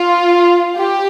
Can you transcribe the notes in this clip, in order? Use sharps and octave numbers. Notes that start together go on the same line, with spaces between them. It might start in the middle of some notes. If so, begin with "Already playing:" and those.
Already playing: F4
G4